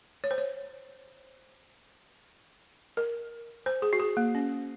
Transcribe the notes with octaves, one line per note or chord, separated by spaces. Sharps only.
C#5
C5
C#5
A#4
C5
G#4
F#4
G#4
A#3
C#4